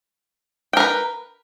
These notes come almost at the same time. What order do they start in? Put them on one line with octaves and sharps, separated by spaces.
G5 A#4 B4